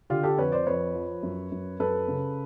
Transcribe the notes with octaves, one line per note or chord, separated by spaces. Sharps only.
D3 F4 G4
G4 A4
F2 B4 C#5
C5 D5
F2 B4 C#5
F3
F#2
F#2
F#2 A4 B4
C#3